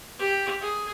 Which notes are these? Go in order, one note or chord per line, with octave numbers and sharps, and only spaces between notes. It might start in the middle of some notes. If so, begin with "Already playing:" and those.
G4
G#4